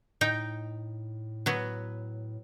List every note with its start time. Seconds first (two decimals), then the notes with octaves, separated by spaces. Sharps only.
0.21 A2 D#4 G5
1.46 F#3 B3